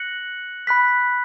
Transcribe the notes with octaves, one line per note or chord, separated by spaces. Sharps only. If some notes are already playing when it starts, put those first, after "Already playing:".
Already playing: F#6 A#6 C#7 F#7
B5 F#6 B6